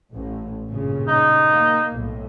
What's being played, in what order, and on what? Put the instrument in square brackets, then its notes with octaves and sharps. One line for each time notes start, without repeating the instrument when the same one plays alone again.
[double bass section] A1 A2
G2 A#2 C#3
[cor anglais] D#4
[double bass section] A#3
B1 A2